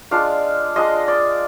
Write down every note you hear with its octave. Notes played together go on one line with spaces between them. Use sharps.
G#3 D4 F4 F5
G#3 D4 F4 D#5
D5